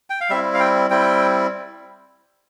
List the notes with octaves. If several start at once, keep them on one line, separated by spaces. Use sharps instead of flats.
G5
F5
G3 C4 E4 E5
F5
G5
G3 C4 E4 G5